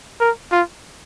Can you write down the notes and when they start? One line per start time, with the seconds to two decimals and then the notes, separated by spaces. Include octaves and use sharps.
0.21 A#4
0.52 F4